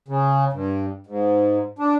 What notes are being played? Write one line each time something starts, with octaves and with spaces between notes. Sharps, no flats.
C#3
G2
G#2
D4